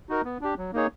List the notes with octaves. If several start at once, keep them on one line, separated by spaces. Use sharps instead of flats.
D#4 F#4 A#4
B3
D4 G4
F#3
A#3 D#4 G#4 C#5